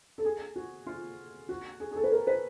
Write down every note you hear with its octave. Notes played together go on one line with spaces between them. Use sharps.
A4
G#4
F#4
F4
F#4
G#4
G#4
A4
B4
A#4
B4